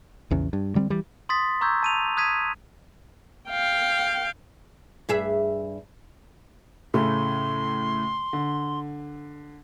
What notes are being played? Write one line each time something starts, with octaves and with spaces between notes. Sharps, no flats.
A#1 E2 C#3
G2
D3 G3 A#3 C4
E3 G3
C6 D#6 A6 B6
A#5 C#6 E6 G6 G#6
A5 D#7 F7
D#6 F#6 G#6 B6 D#7
F5 G5
G2 G#4 E5
A2 C#3 A3 C6
D3